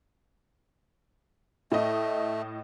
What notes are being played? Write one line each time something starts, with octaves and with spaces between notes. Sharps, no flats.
A2 A3 D#5